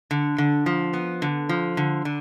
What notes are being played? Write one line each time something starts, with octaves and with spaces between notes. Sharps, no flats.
D3
D3
F3
B3
D3
F3
D3
D3